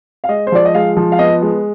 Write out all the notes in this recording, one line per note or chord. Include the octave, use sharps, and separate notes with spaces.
F5
G#3 D#5
C5
F3 D5
D#5
G#3 F5
F3
F5
B3 D#5
G#3